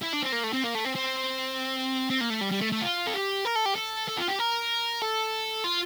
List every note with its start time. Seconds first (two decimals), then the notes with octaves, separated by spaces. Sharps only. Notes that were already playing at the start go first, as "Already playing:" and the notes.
0.02 E4
0.13 D4
0.22 C4
0.32 A#3
0.44 A3
0.53 C4
0.64 A#3
0.75 A3
0.85 C4
0.95 C4
2.10 C4
2.21 A#3
2.30 A3
2.41 G3
2.51 G3
2.61 A3
2.72 A3
2.82 F4
3.07 A4
3.14 G4
3.45 A#4
3.55 A4
3.65 G4
3.75 A4
4.08 A4
4.17 F4
4.28 G4
4.39 A#4
5.01 A4
5.64 F4